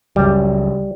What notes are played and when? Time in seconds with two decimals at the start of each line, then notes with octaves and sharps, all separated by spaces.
0.16 F#1 C#2 F#2 G3